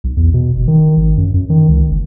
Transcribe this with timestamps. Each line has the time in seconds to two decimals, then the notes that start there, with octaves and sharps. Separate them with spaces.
0.04 B1
0.17 E2
0.34 B2
0.56 F#1
0.68 D#3
0.97 G#1
1.17 F#2
1.34 F#2
1.50 D#3
1.69 C#2
1.89 F#1